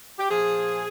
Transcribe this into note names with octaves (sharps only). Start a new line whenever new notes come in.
G4
A#2 F3 G#4